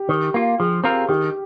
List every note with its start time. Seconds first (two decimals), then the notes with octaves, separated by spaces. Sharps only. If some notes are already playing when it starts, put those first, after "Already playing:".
Already playing: G4
0.09 D#3
0.34 A#3 F4
0.59 F3 G#4
0.84 C4 F4 A#4
1.09 D#3 G4